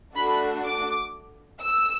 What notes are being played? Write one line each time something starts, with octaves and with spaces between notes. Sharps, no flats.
A3 D4 F#4 A4 B5
D6
E6